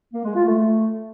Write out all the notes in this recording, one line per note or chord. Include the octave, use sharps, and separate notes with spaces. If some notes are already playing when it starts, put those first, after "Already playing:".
A#3
G#3
F4
A3